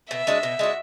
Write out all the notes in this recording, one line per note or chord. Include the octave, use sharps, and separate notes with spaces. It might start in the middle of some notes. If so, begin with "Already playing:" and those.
B2 E5
G#3 D4 F#4
B2
G#3 D4 F#4